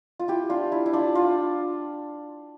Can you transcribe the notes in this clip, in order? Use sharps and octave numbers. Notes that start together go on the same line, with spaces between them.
F4
E4 G4
D4 F4
E4
E4
D4 F4
D4 F4